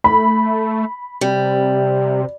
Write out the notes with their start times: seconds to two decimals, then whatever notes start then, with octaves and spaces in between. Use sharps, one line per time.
0.04 A3 B5
1.21 C3 G3